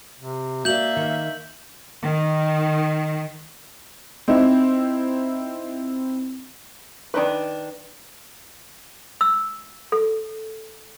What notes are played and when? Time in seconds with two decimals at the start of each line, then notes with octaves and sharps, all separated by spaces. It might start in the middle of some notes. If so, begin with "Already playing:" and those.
0.20 C3
0.65 A#3 F#4 D5 E5 G6 F#7
0.96 D#3
2.02 D#3
4.28 C4 D#4 E4
7.14 D#3 D4 D#4 B4
9.21 E6
9.92 A4